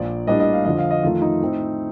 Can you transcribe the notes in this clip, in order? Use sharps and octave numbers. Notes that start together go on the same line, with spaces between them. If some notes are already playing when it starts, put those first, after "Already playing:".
Already playing: A#1 A#2 F3 D5
A2 G3 A#3 D4 D#5
D#5
F5
F2 D3 F3 D#5
F5
D#5
F2 D#3 A3 F4
D#4
A2 A3 C4